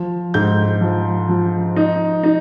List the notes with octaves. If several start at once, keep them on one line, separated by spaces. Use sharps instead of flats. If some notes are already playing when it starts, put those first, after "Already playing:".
Already playing: F3
G#2 G6
F3
F3
D#4
D#4